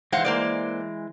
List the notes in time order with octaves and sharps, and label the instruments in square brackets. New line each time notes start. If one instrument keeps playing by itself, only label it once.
[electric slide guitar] E3 G#3 [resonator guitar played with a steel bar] C5 F5 F#5
[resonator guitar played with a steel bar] A#3 C5 D5